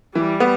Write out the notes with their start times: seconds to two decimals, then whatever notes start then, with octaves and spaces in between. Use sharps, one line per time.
0.15 E3 G3
0.40 B3